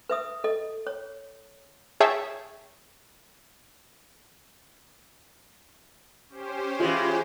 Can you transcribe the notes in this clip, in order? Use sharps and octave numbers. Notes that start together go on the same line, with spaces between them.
B4 E5 D#6
A4 D#5
C#5
G#4 C#5 E5 G5 A5
C#4 G4 C5
E3 G#3 F4